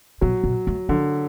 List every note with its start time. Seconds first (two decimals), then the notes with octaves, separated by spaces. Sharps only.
0.21 B2 F#3
0.44 B2
0.67 A3
0.89 D3 F#3